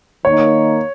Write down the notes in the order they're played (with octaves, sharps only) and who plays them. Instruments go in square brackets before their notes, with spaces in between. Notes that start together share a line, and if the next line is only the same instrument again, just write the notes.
[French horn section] D#3 A#3 D#4 [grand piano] C#5